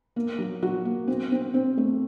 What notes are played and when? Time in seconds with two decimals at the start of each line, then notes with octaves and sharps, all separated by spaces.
0.16 A#3
0.38 F#3
0.62 F#3 F#4
0.85 A#3
1.08 C4
1.32 C4
1.54 C4
1.78 A3